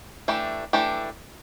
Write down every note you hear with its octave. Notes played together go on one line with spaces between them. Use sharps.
E3 A3 D4 G4
E3 A3 D4 G4